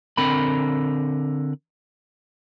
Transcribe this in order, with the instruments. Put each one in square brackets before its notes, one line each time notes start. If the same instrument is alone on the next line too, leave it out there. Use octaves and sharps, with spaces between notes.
[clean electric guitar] D3 C4 A#4 B5